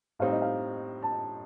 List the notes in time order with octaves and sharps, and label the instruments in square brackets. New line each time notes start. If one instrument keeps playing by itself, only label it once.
[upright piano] A2 G3 C4 D#4 [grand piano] F5
[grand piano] D#5
F5
A5